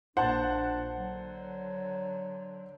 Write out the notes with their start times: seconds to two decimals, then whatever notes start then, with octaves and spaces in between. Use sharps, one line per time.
0.17 A#1 A#2 D4 C5 F#5 A5
0.95 D3 F#3